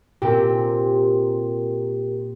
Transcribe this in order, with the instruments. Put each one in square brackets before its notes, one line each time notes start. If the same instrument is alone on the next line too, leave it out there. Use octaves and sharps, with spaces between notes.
[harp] A#2 C4 [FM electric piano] G4 A#4